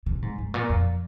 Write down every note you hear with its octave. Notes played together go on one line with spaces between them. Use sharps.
C3
G#2
G#2
A#2
F2